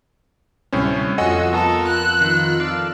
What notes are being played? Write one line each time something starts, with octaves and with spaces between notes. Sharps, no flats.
D2 A2 C3 G3 C4 C#4
F2 F4 F#4 A4 D#5 F#5 G#5 E6
B3 A4 A#4 D#6
F#6
D#3
A4 D5 F5